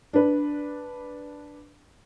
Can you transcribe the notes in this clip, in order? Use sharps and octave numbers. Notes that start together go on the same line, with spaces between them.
D4 B4